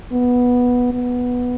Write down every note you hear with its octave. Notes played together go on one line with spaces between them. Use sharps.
B3
B3